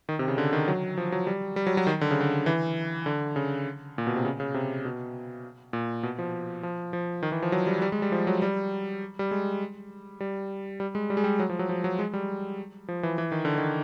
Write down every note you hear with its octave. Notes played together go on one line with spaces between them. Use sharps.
D#3
C3
C#3
D3
D#3
F#3
F3
F#3
G3
G3
F#3
F#3
D#3
D3
C#3
D3
E3
D3
C#3
A#2
B2
C3
C#3
C#3
C3
B2
A#2
B2
F3
F3
F3
D#3
E3
F3
F#3
G3
G3
G#3
G3
F3
F#3
G3
G3
G#3
G3
G3
G#3
G3
G#3
G3
F#3
F3
F#3
F3
F#3
G#3
G3
F3
E3
E3
D#3
D3
D#3